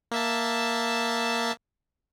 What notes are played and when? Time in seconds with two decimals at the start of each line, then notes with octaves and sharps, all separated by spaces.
0.11 A#3 E5 A5